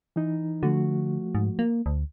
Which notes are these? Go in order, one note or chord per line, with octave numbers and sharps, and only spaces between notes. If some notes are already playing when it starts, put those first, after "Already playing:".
E3 D#4
D3 F3 A3 F#4
G#2
A#3
D2